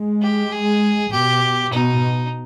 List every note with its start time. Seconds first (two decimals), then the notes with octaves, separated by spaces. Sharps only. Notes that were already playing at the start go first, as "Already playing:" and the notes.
Already playing: G#3
0.22 G4
0.52 G#4
1.12 B2 G4
1.72 B2 D#4